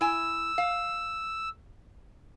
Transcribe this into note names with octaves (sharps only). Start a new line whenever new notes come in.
E4 G#5 E6
F5